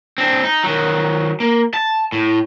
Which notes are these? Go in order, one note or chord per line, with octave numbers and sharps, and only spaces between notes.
C4 D4
D#4
D#3 F#3
A#3
A5
A2